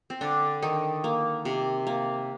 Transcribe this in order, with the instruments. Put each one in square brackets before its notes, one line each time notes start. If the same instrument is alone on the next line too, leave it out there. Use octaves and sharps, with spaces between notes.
[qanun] C4
D3 D4
D#3 D#4
A#3
C3
A#3